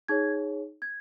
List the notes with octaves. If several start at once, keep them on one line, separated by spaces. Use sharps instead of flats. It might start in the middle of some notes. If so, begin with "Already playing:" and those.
D#4 G#4 C#5 G#6
G#6